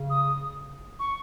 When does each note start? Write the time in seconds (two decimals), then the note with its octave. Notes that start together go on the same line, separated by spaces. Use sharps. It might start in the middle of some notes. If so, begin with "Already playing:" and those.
Already playing: C#3
0.10 D#6
0.99 C#6